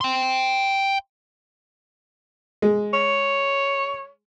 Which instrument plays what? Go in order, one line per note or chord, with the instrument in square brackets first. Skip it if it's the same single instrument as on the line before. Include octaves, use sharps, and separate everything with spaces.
[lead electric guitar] G5 C6
[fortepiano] G#3
[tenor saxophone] C#5